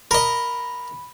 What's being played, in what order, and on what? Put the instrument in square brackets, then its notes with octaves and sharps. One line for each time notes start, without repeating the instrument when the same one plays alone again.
[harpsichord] A#4 D#5 [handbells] B5